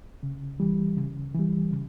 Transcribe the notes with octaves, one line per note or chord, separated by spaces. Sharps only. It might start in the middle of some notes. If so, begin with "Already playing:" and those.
C#3
E3 G3
C#3
E3 G3
C#3